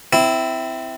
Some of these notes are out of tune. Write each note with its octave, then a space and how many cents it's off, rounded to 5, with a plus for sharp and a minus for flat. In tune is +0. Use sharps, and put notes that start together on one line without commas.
C4 -20 E4 +0